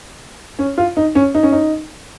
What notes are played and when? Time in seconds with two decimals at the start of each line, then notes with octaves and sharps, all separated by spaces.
0.59 C#4
0.78 F4
0.97 D#4
1.15 C#4
1.35 D#4
1.43 C#4
1.52 D#4